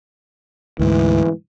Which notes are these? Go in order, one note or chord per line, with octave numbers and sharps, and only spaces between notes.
D2 G#2 E3